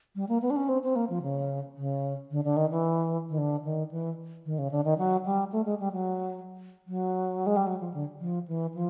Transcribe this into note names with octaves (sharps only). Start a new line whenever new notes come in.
G3
A#3
B3
D4
C#4
C4
C4
A#3
F3
C#3
C#3
D3
D3
D#3
E3
D#3
D3
D#3
E3
D#3
C#3
D3
D#3
F#3
G3
A3
G#3
G3
F#3
F#3
G#3
G3
F#3
F3
D3
F3
E3
F3